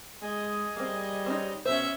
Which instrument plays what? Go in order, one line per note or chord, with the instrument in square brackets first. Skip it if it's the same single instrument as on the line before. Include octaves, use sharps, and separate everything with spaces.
[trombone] G#3 [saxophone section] G#4 D#5
[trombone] G3 [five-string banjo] A#3 C4
[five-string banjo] C4 C#4 D#4
[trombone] B2 [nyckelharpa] C#4 E5 [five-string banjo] C5